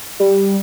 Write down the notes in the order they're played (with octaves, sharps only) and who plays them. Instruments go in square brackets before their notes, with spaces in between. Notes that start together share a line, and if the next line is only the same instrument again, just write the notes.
[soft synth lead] G3